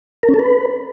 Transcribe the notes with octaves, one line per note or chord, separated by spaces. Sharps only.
A#4
C#4
A4
B4